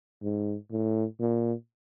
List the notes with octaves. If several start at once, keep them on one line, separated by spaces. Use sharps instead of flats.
G#2
A2
A#2